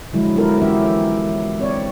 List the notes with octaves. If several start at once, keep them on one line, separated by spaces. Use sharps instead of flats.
D3 F3 F#3 G#3 E4
F#3 B3 E4 F4 A4 A#4
E3 F#3 C#4 G4 E5
C4 C#5 D5